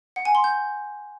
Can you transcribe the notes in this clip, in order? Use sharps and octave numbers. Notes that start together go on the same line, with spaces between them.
F#5
G#5
C6
G6